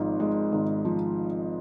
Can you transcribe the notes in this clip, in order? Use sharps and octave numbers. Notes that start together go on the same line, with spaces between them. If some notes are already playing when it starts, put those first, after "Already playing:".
Already playing: G#1 G#2 F3
G#3
G#1
F3